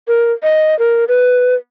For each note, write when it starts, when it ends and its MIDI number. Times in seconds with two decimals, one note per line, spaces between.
0.08 0.32 70
0.43 0.77 75
0.79 1.05 70
1.08 1.55 71